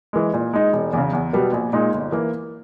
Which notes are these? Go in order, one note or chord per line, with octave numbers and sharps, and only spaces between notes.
E3 G#3
A#2
G#3 D#4
E1
E2 C#3
E2
B2 G3 B3
A#1
A#2 G#3 D#4
G1
E3 A#3